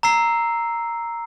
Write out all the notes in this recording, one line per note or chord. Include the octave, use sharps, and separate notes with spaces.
A#5 E6 C7